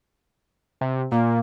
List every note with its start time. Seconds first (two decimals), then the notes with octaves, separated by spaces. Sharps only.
0.81 C3
1.12 A#2 A#3